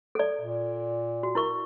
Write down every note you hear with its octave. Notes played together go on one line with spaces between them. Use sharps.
A4 D5
A#2
F#4
E4 A#4 C#6